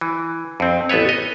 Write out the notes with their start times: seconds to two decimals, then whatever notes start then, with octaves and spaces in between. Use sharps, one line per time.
0.01 E3
0.60 F2 C4
0.89 A1 B3 A4 B4 C#5
1.09 D#5